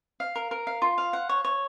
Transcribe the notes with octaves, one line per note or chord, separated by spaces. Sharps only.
F5
A#4
A#4
F5
F4
F5
F#5
C#5
C#5